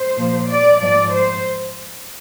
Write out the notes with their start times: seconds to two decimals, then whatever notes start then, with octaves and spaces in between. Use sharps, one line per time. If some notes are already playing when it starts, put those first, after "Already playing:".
Already playing: C5
0.17 A#2 F3
0.49 D5
0.80 G#2 F3 D5
1.12 C5